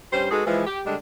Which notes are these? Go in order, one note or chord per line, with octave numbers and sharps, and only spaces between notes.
G2 G3 C#4 C5
G#3 D#4 F#4 G#4 A4 B4
E3 F3 G#3
G4
D3 G3 G#3 D4